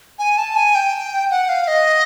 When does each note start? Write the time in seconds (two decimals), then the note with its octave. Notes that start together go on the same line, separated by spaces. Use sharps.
0.19 G#5
0.38 A5
0.56 G#5
0.75 G5
1.31 F#5
1.49 F5
1.68 D#5